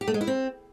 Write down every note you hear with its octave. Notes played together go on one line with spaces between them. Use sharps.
G4
A3
G#3
E4
C4